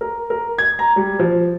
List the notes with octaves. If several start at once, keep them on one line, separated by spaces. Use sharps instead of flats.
A#4
A#4
G#6
A#5
G3
F3